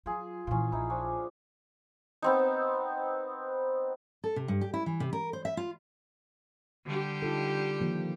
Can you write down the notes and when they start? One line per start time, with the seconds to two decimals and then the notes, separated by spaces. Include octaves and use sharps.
0.06 F#3 F4 G#4
0.47 A#2 E3 C#4 F4
0.72 A#1 D#4 E4
0.90 F3 C#4 D4
2.22 B3 C4 D#4
4.24 A4
4.36 C3
4.48 G2
4.61 G4
4.74 E4
4.86 E3
5.00 C3
5.13 A#4
5.33 C5
5.45 E5
5.57 F4
6.86 D3 G3 G4
7.22 D#4 F4 A4
7.81 D#3 F3 A#3